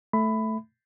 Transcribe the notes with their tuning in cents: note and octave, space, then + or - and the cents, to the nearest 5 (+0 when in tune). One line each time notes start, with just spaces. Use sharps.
A3 +0 E5 +0 B5 +15